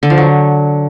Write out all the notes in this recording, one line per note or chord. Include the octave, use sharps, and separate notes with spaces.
D3
F3
F#3